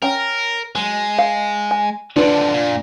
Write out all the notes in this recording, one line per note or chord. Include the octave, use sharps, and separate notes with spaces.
C#4 A#4 G5
F#3 G#3
F5
G#5
D3 F3 D4 F4 B4
A#2